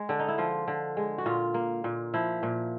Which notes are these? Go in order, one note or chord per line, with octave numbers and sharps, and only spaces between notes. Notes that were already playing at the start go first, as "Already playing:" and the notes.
Already playing: G#3
D3 D4
D#4
E4
F3 F4
D3
G#3
F#4
A#2 F4
A#3
A#2
F3 E4
A#2